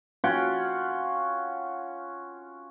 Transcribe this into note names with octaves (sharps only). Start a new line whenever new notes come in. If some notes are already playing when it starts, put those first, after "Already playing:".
C#4 F4 F#4 G5